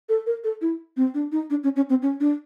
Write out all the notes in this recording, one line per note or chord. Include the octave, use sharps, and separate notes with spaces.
A4
A#4
A4
E4
C4
D4
D#4
D4
C#4
C#4
C4
C#4
D4